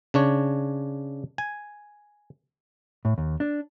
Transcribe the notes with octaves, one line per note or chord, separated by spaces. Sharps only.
C#3 D4 C#5
G#5
A2
D#2
D4